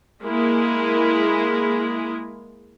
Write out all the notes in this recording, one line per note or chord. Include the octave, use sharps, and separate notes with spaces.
G#3 A#3 E4 G#4